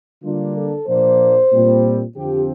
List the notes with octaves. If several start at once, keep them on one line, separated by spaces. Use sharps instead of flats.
D3 G3 A#3 D4 F4
A4
A#2 F3 A#3 D4 C5
A#2 G3 C4
F2 D3 F3 C4 G4